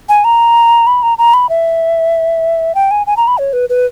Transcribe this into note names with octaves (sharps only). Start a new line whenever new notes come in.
G#5
A#5
B5
A#5
A#5
B5
E5
G5
G#5
G#5
A#5
B5
C#5
B4
B4